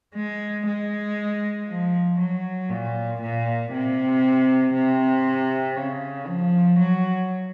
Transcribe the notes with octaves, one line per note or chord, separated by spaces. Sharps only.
G#3
G#3
F3
F#3
A#2
A#2
C3
C3
C#3
F3
F#3